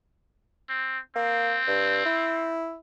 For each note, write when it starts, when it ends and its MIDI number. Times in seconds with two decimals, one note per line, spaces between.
0.69 0.99 60
1.16 1.59 58
1.16 2.56 60
1.68 2.03 43
2.05 2.77 64